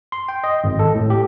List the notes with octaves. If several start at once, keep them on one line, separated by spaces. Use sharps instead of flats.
C6
G5
D#5
G#1
A4
A2
G4